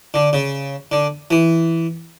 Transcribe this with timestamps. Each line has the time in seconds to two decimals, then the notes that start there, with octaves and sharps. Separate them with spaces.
0.14 D3
0.33 C#3
0.92 D3
1.31 E3